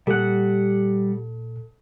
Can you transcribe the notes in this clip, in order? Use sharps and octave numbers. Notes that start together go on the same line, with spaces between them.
A#2 G3 A4 F#5